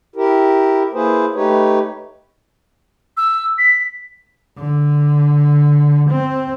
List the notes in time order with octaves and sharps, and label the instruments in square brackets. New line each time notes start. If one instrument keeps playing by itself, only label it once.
[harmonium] E4 G4 A#4
A#3 E4 G#4 B4 C5
A3 D#4 G4 B4 C#5
[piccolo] E6
B6
[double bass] D3
C4